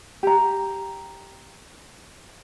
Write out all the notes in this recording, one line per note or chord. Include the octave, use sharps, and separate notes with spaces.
G4 A#5